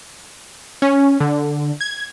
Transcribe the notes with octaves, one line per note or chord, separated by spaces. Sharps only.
C#4
D3
G#6